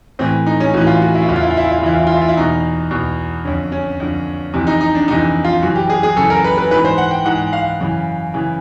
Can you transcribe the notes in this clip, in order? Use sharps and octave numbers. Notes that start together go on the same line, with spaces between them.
A2 E3 C4
D#4
C#4
A2 E3 F#4
F4
F#4
E4
F4
E2 C#3 E3 E4
F4
E4
F4
E4
F4
E4
F4
E2 C#3 E3 E4
F4
E4
F4
E4
F4
E4
E2 B2 D#4
E2 B2
F2 D3 C#4
C#4
F2 D3
F2 C3 E3
D#4
D#4
D4
F2 C3 E3 D#4
F4
F#2 C#3 E3 F#4
G4
G#4
G#4
F#2 C#3 E3 A4
A#4
B4
B4
G#2 E3 B4
C5
F#5
G5
G#2 E3 F#5
F5
F#2 C#3 E3
C#3 E3